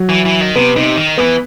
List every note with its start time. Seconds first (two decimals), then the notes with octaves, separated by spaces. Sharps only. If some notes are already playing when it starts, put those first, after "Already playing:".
Already playing: F#3
0.09 E3
0.25 E3
0.41 D#3
0.56 C3 B3
0.76 C3 D#4
0.96 D#3
1.17 E3 B3